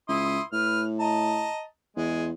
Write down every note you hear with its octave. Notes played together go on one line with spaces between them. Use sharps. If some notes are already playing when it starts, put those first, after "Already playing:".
C#2 E4 C6 D#6
A2 B4 F6
D#5 A5 A#5
E2 G#3